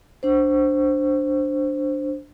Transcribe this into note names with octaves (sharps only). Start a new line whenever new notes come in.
D4 C5